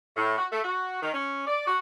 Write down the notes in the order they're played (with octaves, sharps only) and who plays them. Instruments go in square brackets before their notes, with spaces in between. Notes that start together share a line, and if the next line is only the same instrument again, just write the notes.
[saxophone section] A2
F#4
A3
F#4
D#3
C#4
D5
F#4